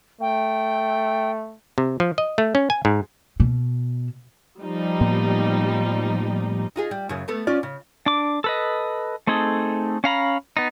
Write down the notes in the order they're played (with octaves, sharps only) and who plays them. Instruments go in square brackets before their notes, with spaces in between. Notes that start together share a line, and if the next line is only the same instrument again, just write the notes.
[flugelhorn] A3 [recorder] G5
[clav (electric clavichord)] C3
F3
D#5
A3
C#4
G#5
G#2
[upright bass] B2
[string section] F3 G3 D#4
[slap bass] A2 A#3 B3
[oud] D#4 F4 G#4
G3
F#2 C#3
A3 B3 A4
C#4 F4 D5
C#3
[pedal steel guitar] D4 D6
A4 B4 D#5
A3 C4 D#4 G#4 A4
C#4 F5 A#5 B5
B3 D#4